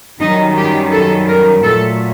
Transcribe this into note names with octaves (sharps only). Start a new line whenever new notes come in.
F#2 D#3 G3 D#4
G4
A4
A#4
A#2 F#3 A3 A4